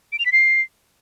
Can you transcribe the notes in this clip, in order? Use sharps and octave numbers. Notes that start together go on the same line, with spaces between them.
D7
F7
B6
C7